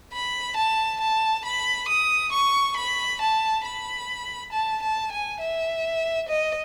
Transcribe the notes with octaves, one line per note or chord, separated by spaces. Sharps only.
B5
A5
A5
B5
D#6
C#6
B5
A5
B5
A5
A5
G#5
E5
D#5